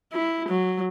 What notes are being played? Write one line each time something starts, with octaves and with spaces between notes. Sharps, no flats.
E4
F#3